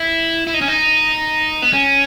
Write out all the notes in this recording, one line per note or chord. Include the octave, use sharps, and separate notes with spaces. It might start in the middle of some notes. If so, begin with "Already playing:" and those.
Already playing: E4
E4
D#4
C#4
D#4
B3
C#4